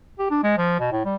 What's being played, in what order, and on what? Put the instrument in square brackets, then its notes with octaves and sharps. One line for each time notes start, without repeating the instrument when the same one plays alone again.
[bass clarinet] G4
D4
G#3
F3
B2
A2
G3